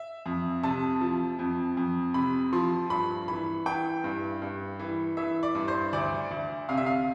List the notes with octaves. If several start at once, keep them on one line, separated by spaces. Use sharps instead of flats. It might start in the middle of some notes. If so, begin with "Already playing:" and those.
Already playing: E5
F2
C3 A5
F3
F2
F2
C3 B5
F3 C6
G2 B5
E3 B5
E3 G5
G2
G2
E3
E3 E5
D5
G2
C5
D2 D5
D2
C3 F5
E5
F5